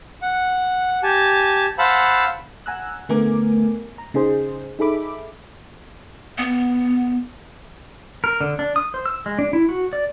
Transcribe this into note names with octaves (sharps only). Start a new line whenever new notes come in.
F#5
G4 G#5 A5
C5 F5 F#5 A5 B5 E6
F#5 G#5 A#5 E6 F#6
D3 A3 B3 A#4 G#5 D6
A#5
C#3 D#4 G#4 C5
D#4 G#4 A4 E5 B5 D6
B3
A#4
D3
D4
D#6
C5
E6
G#3
D4
E4
F#4
D5